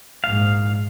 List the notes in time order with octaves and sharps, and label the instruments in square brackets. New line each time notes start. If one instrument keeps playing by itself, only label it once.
[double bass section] A#1 G#2 [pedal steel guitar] F5